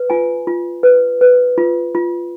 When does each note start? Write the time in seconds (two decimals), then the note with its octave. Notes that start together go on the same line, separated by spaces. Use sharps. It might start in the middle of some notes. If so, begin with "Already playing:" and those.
Already playing: B4
0.10 F4 G#5
0.47 F4
0.83 B4
1.21 B4
1.58 F4
1.95 F4